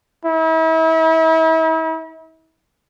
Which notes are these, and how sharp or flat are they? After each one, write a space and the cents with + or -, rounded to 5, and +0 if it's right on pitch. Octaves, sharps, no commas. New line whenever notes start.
E4 -40